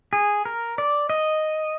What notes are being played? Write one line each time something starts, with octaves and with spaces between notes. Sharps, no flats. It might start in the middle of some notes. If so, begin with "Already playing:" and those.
G#4
A#4
D5
D#5